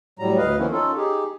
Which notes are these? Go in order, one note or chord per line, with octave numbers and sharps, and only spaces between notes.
A2 F#3 G3 A#5
D2 B4 D#5 F5
D#3 F3 A#3 B3 C#4 E4
C#4 D#4 F4 A4
D#4 G4 G#4